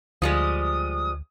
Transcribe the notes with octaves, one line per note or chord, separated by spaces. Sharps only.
D2 F3 G3 G#3 D#6